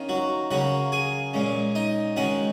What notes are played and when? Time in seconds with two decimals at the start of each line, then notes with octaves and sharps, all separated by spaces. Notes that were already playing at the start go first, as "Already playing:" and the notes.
Already playing: D#3 A#3 C#4
0.09 F#3 F#4
0.51 C#3 F#3 A#3 F#4 F#5
0.92 G#4 G#5
1.33 A#2 G#3 C#4
1.75 D#4 D#5
2.16 D#3 G#3 C#4 F#4 F#5